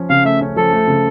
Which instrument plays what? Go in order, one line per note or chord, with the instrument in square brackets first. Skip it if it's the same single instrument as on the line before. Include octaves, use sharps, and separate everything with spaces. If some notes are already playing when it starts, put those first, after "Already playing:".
Already playing: [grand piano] F3 C#4
[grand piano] C#3 [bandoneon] F5
[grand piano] A3 [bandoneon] E5
[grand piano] C#4
[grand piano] F3 [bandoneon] A4
[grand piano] A3
C#3